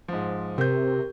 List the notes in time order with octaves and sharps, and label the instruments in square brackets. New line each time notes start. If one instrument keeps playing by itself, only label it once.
[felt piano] G#2 F3
[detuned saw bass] C3 [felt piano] C4 G6 [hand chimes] G4 A#4